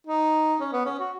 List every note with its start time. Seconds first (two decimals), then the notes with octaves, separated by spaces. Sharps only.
0.07 D#4
0.60 C#4
0.73 B3
0.86 C#4
0.99 F#4